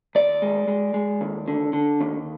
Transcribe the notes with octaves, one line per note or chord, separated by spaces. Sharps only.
D#2 D5
G#3
G#3
G#3
D#2
D3
D3
D#2